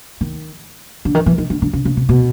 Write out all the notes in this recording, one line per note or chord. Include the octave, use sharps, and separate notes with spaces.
D#3
D3
D#3
E3
D#3
D3
D3
C#3
C#3
C3
B2